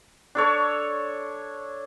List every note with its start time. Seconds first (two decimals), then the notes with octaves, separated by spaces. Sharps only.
0.35 D4 A4 C#5